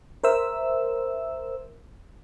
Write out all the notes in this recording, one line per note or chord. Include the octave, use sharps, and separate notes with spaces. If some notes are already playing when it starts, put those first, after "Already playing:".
A#4 C5 E5 E6